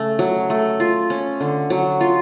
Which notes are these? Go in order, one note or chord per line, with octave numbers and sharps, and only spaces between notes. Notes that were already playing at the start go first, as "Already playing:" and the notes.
Already playing: C#3 A3
F#3
A3
F4
C#4
D3
F#3
F4